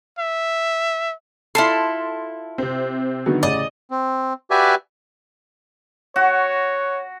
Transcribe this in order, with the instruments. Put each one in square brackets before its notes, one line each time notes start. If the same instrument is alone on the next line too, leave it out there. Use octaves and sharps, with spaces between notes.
[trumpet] E5
[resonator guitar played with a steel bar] E4 A4 [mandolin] F4 A5 C6
[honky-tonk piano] C3 C4
[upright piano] D3 D#3 B3 [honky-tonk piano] F#3
[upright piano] A1 C#3 [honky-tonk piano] D5 [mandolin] D#5
[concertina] C4
F#4 G4 B4 D5 E5 G#5
[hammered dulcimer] F#4 [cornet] C#5